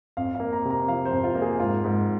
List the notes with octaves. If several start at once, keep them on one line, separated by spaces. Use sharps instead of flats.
F2 F5
A#3 F5
A#5
C3
A#5
F3 F5
C5
F2
F4
A#3
G#4
G#2 F4
G#2